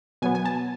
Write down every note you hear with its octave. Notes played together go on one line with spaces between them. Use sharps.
B2 F#3 B3 G#5
G#5
A5